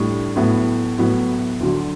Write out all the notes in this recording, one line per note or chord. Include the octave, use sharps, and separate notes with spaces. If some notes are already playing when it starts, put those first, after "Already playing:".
Already playing: A2 G3 D4
A2 F#3 B3 E4
A2 F#3 B3 E4
D2 D3 F#3